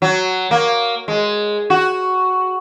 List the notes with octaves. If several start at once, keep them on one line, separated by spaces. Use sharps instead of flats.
F#3
A#3
G#3
F#4